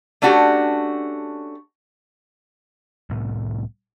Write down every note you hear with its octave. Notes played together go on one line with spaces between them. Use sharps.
A3 C#4 D4 F#4 G4
C2 A2 B3